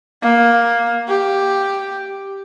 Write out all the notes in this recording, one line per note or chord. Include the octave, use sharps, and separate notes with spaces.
A#3
G4